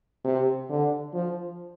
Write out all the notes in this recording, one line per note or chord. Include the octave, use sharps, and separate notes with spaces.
C3
D3
F3